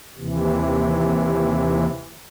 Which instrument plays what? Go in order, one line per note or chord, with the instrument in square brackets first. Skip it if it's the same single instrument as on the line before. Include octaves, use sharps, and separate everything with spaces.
[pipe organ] D#2 C3 E3